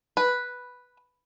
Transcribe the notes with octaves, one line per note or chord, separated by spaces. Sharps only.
B4